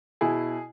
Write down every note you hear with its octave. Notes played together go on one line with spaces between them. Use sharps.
B2 E4 G#4